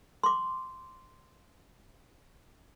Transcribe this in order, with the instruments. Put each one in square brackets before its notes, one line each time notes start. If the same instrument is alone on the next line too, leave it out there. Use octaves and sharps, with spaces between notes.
[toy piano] C6 D6